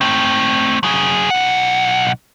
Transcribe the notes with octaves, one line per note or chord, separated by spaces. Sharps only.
A3 C4
F#3 G#4
B1 F#5